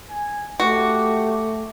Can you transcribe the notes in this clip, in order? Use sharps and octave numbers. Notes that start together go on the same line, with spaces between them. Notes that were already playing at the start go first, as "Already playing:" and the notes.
G#5
A3 F#4 G4